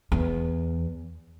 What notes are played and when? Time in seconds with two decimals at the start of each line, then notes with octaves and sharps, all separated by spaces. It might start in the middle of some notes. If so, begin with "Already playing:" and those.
0.12 E2